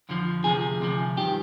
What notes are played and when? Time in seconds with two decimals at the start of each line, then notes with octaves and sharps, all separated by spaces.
0.09 F2 D3 F3
0.44 D2 C3 F3 G#4
0.80 D2 C3 F3
1.16 G2 D#3 G4